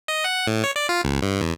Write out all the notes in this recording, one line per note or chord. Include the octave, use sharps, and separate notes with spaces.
D#5
F#5
A2
C#5
D5
F4
C#2
G2
E2